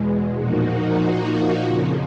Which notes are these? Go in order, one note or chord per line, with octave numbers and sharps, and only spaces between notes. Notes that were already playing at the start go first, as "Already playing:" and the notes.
Already playing: E2 B2 G#3
A#2 F3 A#3 D#4 F#4
F2 C#3 F3